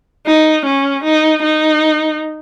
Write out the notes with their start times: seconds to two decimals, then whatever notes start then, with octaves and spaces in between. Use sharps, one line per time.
0.27 D#4
0.66 C#4
1.04 D#4
1.43 D#4